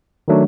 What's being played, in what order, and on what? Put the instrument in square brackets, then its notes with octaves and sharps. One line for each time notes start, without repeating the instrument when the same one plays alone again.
[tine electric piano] D#3 F#3 A3 D4